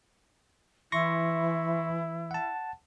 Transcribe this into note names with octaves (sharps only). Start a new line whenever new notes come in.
E3 E4 C6 C#6 A#6
F#5 A5